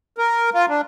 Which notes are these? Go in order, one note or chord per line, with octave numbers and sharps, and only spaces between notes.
A#4
F4
D4